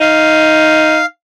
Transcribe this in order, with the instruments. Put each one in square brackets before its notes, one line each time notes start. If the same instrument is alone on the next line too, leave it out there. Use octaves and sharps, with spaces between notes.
[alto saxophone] D#4 [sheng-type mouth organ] F5